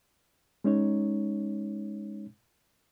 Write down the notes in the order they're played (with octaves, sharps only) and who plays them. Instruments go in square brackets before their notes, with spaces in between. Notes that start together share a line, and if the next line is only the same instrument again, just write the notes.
[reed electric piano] G#3 C#4 D#4 C#5